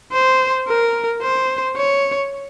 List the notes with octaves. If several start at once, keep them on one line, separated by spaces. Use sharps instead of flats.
C5
A#4
C5
C#5